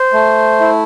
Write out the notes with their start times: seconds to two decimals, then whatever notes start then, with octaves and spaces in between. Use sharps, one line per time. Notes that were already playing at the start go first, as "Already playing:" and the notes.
Already playing: C5
0.13 A3
0.61 E4